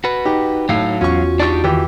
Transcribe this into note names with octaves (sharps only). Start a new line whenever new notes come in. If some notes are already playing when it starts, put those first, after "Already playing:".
F#4 B4
D#4 G4
A2 F#3 F5
E2 C#4 F4 F#4 C#6
D4 D#4 G4 D5 C#6
D#3 E3 G4